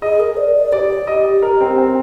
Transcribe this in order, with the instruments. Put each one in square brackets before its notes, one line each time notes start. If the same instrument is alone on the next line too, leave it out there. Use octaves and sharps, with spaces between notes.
[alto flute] G#4 [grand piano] D#5
[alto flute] A#4
D5
D5
[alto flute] G4 [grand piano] D5
[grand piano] D#5
A#4
C4
C4